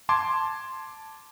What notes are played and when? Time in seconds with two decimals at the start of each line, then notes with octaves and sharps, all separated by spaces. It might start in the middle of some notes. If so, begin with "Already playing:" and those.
0.09 A5 C6 D6 G#6